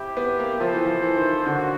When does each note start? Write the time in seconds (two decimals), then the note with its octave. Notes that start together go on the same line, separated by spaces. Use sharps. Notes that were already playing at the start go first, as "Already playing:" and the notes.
Already playing: C4 E4 G4
0.17 B3
0.39 A#3
0.59 F3 C4 E4 A4 C5
0.73 E3
0.85 F3
1.03 E3
1.17 D#3
1.45 D3 A#3 C#4 F#4